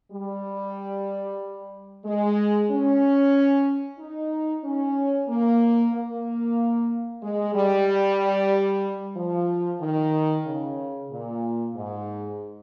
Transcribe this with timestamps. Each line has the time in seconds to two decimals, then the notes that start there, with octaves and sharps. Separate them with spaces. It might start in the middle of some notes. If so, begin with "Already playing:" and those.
0.11 G3
2.05 G#3
2.70 C#4
3.99 D#4
4.64 C#4
5.28 A#3
5.93 A#3
7.22 G#3
7.54 G3
9.16 F3
9.80 D#3
10.45 C#3
11.11 A#2
11.75 G#2